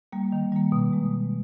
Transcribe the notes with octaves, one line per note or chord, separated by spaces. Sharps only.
G3 A#3
D#3
G3 A#3
B2
G#3